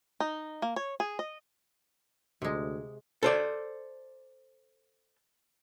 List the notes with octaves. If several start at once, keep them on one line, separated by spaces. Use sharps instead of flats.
D#4
A#3
C#5
G#4
D#5
D2 C3 G#3
A4 C5 D5